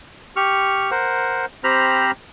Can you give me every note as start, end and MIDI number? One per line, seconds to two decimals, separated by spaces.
0.36 0.90 67
0.36 0.90 85
0.36 0.90 89
0.91 1.45 70
0.91 1.45 72
0.91 1.45 78
1.64 2.11 60
1.64 2.11 67
1.64 2.11 72
1.64 2.11 82
1.64 2.11 83
1.64 2.11 89